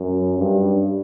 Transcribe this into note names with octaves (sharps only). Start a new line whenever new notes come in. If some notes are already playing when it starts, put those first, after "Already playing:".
Already playing: F#2
G2